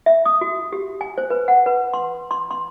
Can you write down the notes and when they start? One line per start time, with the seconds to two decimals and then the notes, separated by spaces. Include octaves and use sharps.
0.06 E5
0.26 D#6
0.41 F#4
0.73 G4
1.01 G#5
1.18 C5
1.30 B4
1.48 F#5
1.66 B4
1.93 C6
2.31 C6
2.51 C6